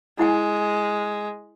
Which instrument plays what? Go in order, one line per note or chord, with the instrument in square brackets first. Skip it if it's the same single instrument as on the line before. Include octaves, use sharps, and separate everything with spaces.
[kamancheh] G#3 [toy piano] E4 F#5 G#5